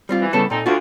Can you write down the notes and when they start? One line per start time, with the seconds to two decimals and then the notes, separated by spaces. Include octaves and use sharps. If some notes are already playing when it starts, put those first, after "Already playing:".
0.09 G3 C4 F4
0.21 E3
0.33 A2 C#3 G3 B3 A4
0.50 A#2 C4 D#4 A4
0.66 D2 F4 F#4